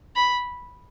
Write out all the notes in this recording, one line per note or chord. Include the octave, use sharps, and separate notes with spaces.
B5